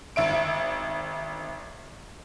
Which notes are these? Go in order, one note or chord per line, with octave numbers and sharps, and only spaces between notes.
G#1 E5 D7